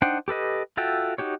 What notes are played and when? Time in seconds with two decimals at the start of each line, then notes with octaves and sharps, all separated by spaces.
0.02 D4 D#4 C5 F#5 G5
0.28 G4 A4 B4 D#5
0.77 F4 F#4 A4 E5 G5
1.18 D#4 F#4 G4 C#5